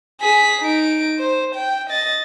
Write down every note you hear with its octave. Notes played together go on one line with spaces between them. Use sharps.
G#4 B6
D#4 D7
C5
G5
D#5 A6